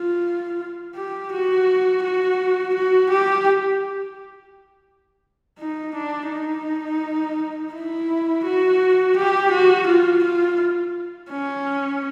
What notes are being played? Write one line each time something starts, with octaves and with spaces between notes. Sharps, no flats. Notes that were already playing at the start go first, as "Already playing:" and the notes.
Already playing: F4
G4
F#4
F#4
F#4
G4
D#4
D4
D#4
E4
F#4
G4
F#4
F4
F4
C#4